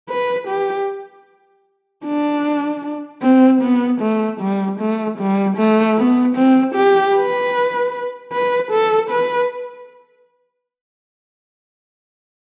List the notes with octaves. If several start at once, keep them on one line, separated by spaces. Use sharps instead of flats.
B4
G4
D4
C4
B3
A3
G3
A3
G3
A3
B3
C4
G4
B4
B4
A4
B4